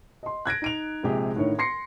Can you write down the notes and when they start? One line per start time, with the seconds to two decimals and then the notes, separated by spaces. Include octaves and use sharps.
0.23 D#5 C6
0.45 F#6 G#6 A#6 D7
0.62 D#4 D7 F7
1.03 A#1 C3 G#3 G4 G#4
1.36 A2 D3 D#3 C#5
1.59 C6 A#6 C7 C#7